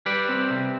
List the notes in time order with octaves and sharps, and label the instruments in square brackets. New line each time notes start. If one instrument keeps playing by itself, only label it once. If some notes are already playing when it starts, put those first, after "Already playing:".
[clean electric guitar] G3 B4 D5
C4
C3